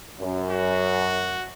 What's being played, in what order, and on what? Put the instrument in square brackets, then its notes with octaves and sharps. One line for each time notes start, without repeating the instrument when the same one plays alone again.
[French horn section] F#2
[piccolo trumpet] F#4